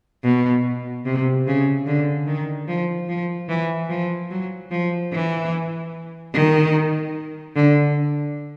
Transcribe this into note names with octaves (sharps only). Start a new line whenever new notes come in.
B2
C3
C#3
D3
D#3
F3
F3
E3
F3
F#3
F3
E3
D#3
D3